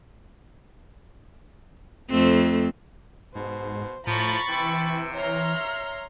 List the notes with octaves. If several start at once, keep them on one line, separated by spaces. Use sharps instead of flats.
F2 A3 C4
G#2 B2 C5
A2 F3 A#5 B5 C#6 A6
C3 E3 G5 E6
C#5 E5 A#5 C6 F6